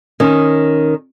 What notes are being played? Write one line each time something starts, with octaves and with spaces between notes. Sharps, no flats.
D#3 C#4